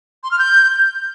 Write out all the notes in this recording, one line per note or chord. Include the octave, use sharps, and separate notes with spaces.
C6
F6
G6